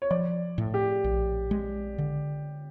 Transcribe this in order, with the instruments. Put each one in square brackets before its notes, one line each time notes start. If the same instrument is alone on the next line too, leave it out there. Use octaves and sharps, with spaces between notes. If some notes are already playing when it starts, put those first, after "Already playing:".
[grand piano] C#5
[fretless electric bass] F3 [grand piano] D5
[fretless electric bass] A2
[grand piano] G4
[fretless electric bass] A#1
G#3
D3